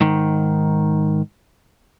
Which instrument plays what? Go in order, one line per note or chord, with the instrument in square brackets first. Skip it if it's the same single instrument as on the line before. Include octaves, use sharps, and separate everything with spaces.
[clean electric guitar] G#2 D#3